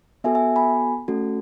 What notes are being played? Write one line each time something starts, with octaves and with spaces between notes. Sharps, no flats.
B3 F#4 A4 E5 G#5
E5 G#5
G#5 B5
A3 C#4 F#4 A4